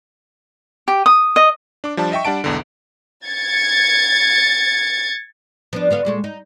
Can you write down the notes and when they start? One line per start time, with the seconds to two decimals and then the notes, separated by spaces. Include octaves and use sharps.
0.88 G4
1.06 D#6
1.36 D#5
1.84 D4 D6
1.97 F3 G3 D4 A5
2.12 D#5 E5 G5 C#6
2.25 G3 D4 F#5 A5 D7
2.44 B1 E2 D3
3.25 G#6 A6 C#7
5.73 F3 B3 D4
5.90 D3 B3 F5
6.05 A#2 G#3 A3
6.24 D#4